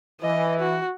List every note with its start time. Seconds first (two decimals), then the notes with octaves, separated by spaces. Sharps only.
0.22 E3 D#5
0.60 F#4